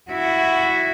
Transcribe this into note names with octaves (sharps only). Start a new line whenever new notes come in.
E4 F#4